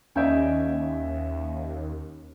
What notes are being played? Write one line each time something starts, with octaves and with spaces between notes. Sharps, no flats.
D#2 C#4 D#5 E5 G#5 G6 D7